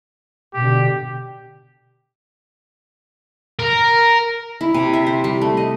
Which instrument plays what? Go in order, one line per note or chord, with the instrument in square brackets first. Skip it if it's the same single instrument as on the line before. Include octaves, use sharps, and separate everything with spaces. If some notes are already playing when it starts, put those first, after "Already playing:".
[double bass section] B2 D3 [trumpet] G4
[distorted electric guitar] A#4
[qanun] E4
C3
E5
C5
G3
A3
D#5